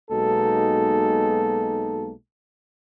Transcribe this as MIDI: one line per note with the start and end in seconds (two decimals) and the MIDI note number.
0.11 2.13 35
0.11 2.13 47
0.11 2.13 56
0.11 2.13 58
0.11 2.13 63
0.11 2.13 69